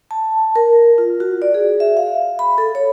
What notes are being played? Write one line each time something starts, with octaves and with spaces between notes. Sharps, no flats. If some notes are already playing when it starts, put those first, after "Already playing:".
A5
A#4
F4
F#4
D5
G#4
E5
F5
B5
A4
C#5